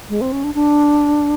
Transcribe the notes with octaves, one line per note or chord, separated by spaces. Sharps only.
G#3
C4
C#4
D4
D4